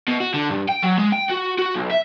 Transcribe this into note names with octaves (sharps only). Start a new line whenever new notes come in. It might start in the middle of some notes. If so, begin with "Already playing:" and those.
B2
F#4
D3
G2
G5
F#3
G#3
G5
F#4
F#4
B1
E5